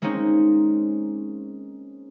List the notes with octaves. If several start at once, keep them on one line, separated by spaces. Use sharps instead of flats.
G#3 A#3 C4 C#4 D#4 G#4